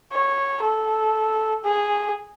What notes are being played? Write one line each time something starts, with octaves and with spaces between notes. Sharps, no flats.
C#5
A4
G#4